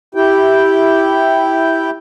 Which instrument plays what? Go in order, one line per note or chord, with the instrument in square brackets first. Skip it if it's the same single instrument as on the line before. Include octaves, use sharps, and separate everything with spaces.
[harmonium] E4 G4 G5